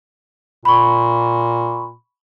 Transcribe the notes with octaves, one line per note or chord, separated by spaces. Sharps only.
A#2 B5 C#6